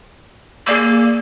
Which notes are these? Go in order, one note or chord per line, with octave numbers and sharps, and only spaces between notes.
A#3 G#4 D5 E6